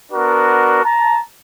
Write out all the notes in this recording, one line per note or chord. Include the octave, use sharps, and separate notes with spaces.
B3 D4 F#4 A#4
A5 A#5